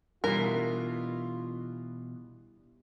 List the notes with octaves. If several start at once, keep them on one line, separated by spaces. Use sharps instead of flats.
B2 E3 G3 D4 E4 F4 A#4